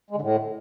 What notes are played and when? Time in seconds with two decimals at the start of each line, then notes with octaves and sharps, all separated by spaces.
0.10 G#3
0.16 D3
0.21 A2